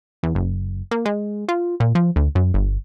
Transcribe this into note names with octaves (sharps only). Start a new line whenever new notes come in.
E2
F#1
A#3
G#3
F4
A#2
F3
D2
F#2
G1